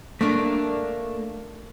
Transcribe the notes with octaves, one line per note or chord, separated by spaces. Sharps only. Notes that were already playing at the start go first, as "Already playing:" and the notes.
A3 A#3 D4